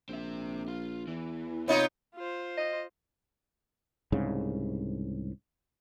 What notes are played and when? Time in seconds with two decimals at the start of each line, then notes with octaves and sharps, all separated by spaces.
0.09 A#1 C4 E5
0.68 F4
1.07 E2 E3
1.68 C3 B3 C4 D#4 F4 C#5
2.14 F4 C5
2.57 D#5
4.12 C2 G#2 C#3